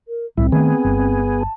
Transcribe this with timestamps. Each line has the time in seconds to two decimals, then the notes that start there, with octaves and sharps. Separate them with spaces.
0.08 A#4
0.37 C2 A2 C4 E4
0.52 D#3 A3 B3 G#4
0.85 G1
1.40 A5